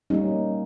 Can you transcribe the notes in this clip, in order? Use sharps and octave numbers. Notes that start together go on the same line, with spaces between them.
G3 A#3 C#4 D#4